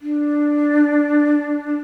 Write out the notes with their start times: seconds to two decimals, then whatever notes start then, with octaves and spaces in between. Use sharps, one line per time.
0.01 D4